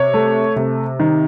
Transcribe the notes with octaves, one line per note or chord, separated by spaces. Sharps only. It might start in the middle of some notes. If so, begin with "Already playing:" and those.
Already playing: C3 C#5
A3
C3
D#3